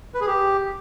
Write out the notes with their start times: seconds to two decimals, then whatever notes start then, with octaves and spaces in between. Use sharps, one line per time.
0.14 B4
0.21 G#4
0.27 G4